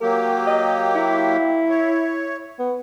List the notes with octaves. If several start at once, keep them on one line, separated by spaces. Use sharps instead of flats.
F#3 A#3 G4 A#4
D#5
E4
C#5
B3